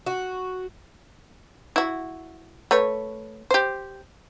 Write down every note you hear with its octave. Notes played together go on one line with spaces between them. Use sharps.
F#4
E4 F#4
A3 B4 C#5
G4 C5